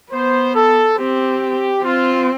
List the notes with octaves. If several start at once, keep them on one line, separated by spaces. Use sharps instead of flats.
B3 C5
A4
C4 G4
C4 F4